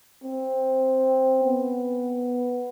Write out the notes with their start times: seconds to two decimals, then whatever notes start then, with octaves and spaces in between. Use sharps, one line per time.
0.24 C4
1.44 B3